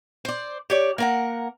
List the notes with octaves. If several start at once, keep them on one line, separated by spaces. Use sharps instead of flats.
C5 D5
G4 C#5 D5
A#3 A#4 F#5